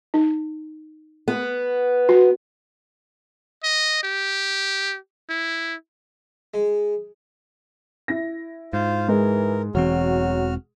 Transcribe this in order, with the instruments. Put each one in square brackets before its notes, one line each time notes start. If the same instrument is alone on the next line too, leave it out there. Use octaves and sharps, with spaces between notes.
[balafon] D#4
[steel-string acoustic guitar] B3
[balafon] F#4
[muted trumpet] D#5
G4
E4
[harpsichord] G#3
[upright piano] E4 A#6
[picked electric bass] G#2 [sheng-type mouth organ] F4 C5 F5
[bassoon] E3 [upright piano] G#3 [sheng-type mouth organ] A#4
[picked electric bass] E1 E3 C4 [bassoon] F#3 [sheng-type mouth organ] F#4 F6